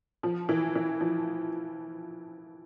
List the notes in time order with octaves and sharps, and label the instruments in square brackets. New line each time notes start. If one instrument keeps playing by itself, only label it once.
[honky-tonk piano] F3
E3
E3
F3